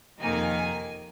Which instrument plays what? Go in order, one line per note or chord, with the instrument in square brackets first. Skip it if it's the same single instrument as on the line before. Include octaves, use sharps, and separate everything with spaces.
[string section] F2 C3 D#3 A#3 D#4 G#5